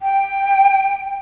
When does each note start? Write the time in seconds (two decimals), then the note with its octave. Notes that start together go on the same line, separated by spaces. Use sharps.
0.01 G5